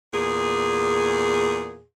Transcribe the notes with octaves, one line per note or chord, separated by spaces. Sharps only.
E2 A#2 G#4